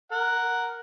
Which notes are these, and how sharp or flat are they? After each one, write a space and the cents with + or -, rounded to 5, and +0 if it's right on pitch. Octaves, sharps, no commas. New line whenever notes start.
A#4 +0 F#5 +0